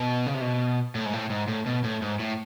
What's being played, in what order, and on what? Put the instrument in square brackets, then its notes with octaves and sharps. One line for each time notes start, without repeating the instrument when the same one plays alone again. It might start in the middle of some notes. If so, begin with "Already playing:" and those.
Already playing: [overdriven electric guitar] B2
C#3
C3
B2
A2
G#2
A2
G#2
A2
B2
A2
G#2
A2